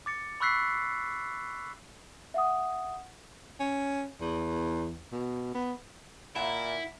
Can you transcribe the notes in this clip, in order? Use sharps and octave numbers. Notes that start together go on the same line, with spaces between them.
D6 A6 C#7
B5 C#6 E6 F#6 B6 C7
E5 F#5 D#6
C#4
E2
B2
B3
A#2 E4 E5 F#5 A5